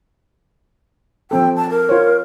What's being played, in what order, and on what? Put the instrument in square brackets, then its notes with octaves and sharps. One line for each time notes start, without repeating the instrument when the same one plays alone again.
[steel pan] F3 C4 A4 [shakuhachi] G5
[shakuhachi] A5
A#4
[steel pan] F4 C5 C#5